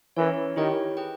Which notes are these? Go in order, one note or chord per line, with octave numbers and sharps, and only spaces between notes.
E3 C#4 E4 A#4 C#5
D#3 E4 G4 C#5 G5
G#4 B4 G5